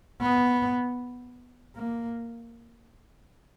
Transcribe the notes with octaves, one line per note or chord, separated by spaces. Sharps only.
B3
A#3